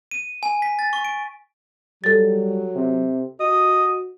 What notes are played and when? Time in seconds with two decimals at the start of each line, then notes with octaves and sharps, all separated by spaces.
0.11 D#7
0.43 G#5
0.62 B6
0.79 A6
0.93 C#6
1.05 D7
2.04 F#3 G3 A4 A6
2.75 C3
3.40 F#4 D#5